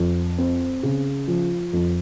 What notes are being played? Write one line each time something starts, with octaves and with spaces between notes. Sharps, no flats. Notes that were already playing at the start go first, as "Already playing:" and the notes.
Already playing: F2
C4
C#3
F3
F2